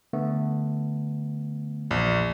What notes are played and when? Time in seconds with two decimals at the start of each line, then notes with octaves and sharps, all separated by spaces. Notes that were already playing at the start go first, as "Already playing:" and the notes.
0.13 D3 A3 B3
1.91 A#1 E2